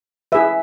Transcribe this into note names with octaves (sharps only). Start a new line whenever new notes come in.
E4 G#4 B4 E5